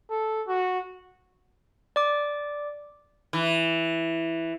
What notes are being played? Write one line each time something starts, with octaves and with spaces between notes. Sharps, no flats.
A4
F#4
D5 D6
E3